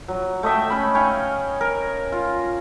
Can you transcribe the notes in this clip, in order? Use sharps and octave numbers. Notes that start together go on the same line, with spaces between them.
F#3
A3 D#5 E5 G5
C#4 B5
F5 G5 G#5 C#6
A#4
F4